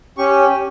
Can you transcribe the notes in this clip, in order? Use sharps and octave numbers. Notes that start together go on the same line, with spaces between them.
C#4 G4 C#6